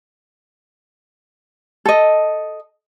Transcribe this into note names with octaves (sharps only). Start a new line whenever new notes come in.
A4 D#5